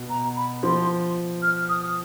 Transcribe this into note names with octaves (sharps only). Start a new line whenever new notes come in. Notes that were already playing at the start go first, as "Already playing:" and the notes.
Already playing: B2
A#5
B5
F3 C6
F6
D#6